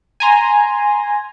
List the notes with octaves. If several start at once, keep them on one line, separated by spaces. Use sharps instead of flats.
G#5 A#5 C6